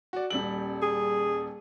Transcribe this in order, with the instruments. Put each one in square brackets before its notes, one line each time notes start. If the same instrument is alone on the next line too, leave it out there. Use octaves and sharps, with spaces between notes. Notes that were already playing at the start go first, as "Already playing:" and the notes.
[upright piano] F#4 D5
D#1 G3 F#7
[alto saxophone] G#4